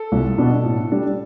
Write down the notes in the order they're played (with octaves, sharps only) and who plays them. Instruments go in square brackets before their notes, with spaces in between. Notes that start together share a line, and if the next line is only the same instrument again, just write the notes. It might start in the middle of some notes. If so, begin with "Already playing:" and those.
Already playing: [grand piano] A4
C2
B2 B3 D4
A2
G3 D4